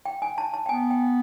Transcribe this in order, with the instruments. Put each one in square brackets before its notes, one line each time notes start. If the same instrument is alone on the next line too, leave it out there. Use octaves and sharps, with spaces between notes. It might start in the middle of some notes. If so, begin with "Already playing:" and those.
[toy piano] G5
G#5
A5
A5
G5
[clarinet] B3 [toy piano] G#5
[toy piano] G5